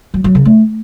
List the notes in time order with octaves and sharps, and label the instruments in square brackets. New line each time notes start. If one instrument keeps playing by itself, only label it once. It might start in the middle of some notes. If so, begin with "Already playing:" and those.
[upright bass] F#3
F#3
C#3
A3